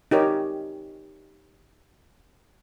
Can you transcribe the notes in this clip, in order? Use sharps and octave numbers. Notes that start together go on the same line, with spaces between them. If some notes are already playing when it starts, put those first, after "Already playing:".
D#4 G4 A#4 C#5